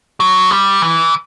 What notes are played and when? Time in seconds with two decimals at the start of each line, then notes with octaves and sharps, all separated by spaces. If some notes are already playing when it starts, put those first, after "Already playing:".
0.20 F#3
0.51 G3
0.82 E3